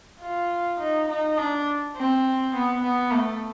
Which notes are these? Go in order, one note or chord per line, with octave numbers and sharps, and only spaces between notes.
F4
D#4
D#4
D4
C4
B3
B3
A3